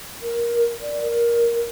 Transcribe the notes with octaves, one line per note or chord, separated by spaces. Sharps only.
A#4
D5
A#4